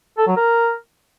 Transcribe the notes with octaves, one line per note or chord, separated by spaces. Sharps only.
A4
F#3
A#4